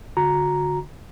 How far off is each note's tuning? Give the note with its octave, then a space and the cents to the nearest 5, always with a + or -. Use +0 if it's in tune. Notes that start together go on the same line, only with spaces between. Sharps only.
D3 -10 F#4 -25 A#5 +0